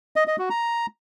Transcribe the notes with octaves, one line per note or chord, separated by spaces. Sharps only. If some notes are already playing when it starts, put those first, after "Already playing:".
D#5
D#5
F#4
A#5